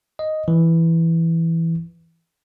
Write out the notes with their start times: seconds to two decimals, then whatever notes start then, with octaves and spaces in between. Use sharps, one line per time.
0.19 D#5
0.48 E3